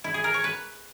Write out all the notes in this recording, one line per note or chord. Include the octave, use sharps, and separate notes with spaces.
E4
G#4
A#4
C#5
B4